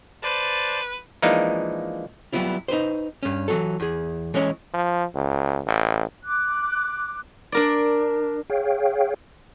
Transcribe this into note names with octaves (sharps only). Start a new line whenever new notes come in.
B4 C5 D5 A5
E3 F3 G#3 A#3 D4 D#4
F#3 G3 B3 E4 F4
D#4 B4 C5
G2 C#4
E3 F#3 A4
E2 G#4
E3 G#3 C#4 C#5
F3
C#2
A1
D6 F#6
D4 A#4 D5
G#4 C#5 F5 G5